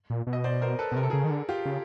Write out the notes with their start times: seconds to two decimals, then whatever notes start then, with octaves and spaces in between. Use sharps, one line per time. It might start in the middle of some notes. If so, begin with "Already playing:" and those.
0.10 A#2
0.27 B2
0.33 D#5
0.44 C5 D5
0.62 A#4 C5
0.79 A4 B4
0.92 B2
0.96 C3 A#4
1.03 A4
1.10 C#3 G#4 A#4
1.24 D#3
1.31 D3
1.49 F4 G4
1.65 C#3